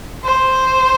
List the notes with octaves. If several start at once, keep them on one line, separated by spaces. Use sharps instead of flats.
C5